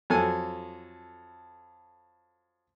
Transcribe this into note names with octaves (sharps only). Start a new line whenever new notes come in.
F2 F#3 A4 G#5